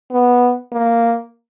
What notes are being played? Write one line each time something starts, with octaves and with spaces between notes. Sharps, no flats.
B3
A#3